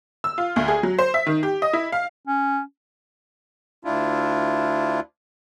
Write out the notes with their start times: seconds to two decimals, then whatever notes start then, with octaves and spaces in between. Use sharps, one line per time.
0.24 E6
0.38 F4
0.56 D2
0.68 G#4
0.83 F#3
0.98 C5
1.14 E5
1.27 D#3
1.43 G4
1.62 D#5
1.73 E4
1.92 F5
2.27 C#4
3.85 D2 D4 E4 F4